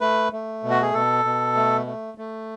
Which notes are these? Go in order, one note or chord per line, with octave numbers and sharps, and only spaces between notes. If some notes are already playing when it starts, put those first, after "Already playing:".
A3 B4
A3
B2
F#4
G#4
B2 A4
B2
A3
A3
A3